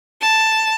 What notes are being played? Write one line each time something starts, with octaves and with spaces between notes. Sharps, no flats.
A5